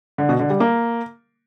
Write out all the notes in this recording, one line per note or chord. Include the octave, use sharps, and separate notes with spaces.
D3
B2
D3
G3
A#3